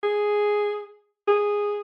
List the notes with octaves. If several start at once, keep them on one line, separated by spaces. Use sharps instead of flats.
G#4
G#4